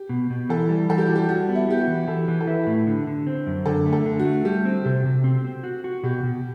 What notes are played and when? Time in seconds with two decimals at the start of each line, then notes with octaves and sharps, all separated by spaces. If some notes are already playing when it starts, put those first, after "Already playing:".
Already playing: G4
0.09 B2
0.30 B2
0.49 E3 A4
0.69 G3
0.89 E3 A4
0.98 G4
1.07 G3 F#4
1.16 G4
1.29 G3 F#4
1.49 B3
1.55 E4
1.68 B3 G4
1.81 F#4
1.87 E3
2.08 E3 A4
2.28 E3
2.41 A4
2.47 E4 B4
2.67 A2
2.87 D3
3.07 D3
3.27 C4
3.47 F#2
3.66 D3 A4
3.86 A3
3.93 A4
4.06 D3
4.20 F#4
4.25 A3
4.45 G3 G4
4.65 C4
4.85 C3 G4
5.05 C3
5.24 C4
5.44 C4
5.64 F#4
5.84 F#4
6.03 B2 G4
6.23 B2